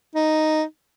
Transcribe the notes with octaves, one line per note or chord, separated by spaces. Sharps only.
D#4